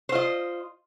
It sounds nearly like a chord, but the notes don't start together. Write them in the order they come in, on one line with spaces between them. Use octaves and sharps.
C5 F4 D#5